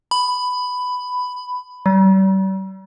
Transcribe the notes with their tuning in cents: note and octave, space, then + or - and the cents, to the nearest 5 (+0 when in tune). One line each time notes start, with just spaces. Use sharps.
B5 +10
G3 -40